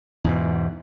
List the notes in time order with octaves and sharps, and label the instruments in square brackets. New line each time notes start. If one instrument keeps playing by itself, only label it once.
[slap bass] E2 G#2 B2